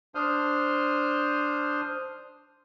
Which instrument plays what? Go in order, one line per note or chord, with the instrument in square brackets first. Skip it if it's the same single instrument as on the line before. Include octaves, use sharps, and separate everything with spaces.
[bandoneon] D4 C5 D#6 F6 G6